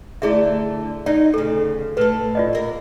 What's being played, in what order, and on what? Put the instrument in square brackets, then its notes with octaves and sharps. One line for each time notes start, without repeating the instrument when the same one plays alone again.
[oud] D3 A3 D5 [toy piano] E4 G#4 E5
[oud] D#4 [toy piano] D5
[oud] D2 C#3 [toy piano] A4
[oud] A2 A4 [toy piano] B4
[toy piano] F4 D5 D#5
[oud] A#3 A#4